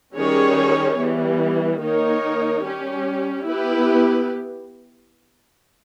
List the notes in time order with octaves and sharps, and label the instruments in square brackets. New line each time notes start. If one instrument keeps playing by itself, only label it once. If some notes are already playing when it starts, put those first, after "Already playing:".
[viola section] D#3 G3 C#4 G#4 C#5
E3 G3 B3
D#3 A#3 D#4 A#4 C#5
G3 C#4 G4
B3 E4 G4 B4